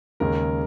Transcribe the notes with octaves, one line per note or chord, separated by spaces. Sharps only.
D#2 C#3 G#3 A#4